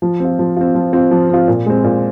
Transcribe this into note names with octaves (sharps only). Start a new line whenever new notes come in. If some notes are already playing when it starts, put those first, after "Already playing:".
F3
C4 F4
F3
C4 F4
F3
C4 F4
F3
C4 F4
A#2
G#3 C4
A#2